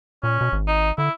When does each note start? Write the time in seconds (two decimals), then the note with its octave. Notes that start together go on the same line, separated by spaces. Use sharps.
0.23 A#2 C#4
0.41 B2
0.53 G#1
0.68 D#4
0.98 D3 E4